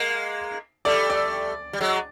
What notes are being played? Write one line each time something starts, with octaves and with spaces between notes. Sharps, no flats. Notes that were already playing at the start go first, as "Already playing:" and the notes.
Already playing: G#3 A#3
G3 A3 D5
D5
G3
F#3 G#3